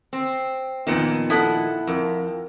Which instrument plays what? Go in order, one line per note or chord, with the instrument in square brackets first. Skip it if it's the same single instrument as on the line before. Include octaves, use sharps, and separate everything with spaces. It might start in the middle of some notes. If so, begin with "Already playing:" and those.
[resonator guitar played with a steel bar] C4
[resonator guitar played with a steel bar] F2 A#2 D#3 [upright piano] B3 C#7
[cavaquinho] E4 F#5 [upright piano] A4 A5 D#6
[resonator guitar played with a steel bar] F2 [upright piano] A#4